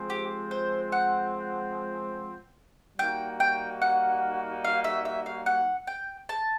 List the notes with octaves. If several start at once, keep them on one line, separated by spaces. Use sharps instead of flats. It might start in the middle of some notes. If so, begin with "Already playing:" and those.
Already playing: F3 G#3 C4
G4
C5
F#5
G3 A#3 D#4 F#4 G5
G5
F#5
F5
E5
E5
F5
F#5
G5
A5